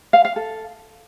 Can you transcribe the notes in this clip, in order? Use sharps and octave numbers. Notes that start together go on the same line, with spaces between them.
F5
F5
A4